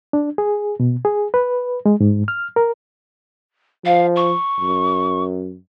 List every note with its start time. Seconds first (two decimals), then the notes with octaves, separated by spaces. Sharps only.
0.13 D4
0.38 G#4
0.80 B2
1.05 G#4
1.34 B4
1.86 G#3
2.00 G#2
2.28 F6
2.56 A#4
3.86 F3 F5
4.16 C#6
4.60 F#2